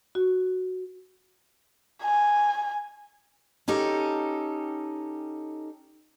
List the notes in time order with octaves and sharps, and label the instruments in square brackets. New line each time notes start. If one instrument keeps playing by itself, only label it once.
[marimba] F#4
[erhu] G#5
[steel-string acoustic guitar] C#4 D#4 G4 A4